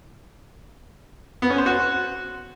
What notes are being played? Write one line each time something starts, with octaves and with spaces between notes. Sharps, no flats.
B3
C#4
C5
F#4